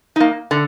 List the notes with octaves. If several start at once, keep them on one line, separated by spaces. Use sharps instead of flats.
A#3 D#4
D3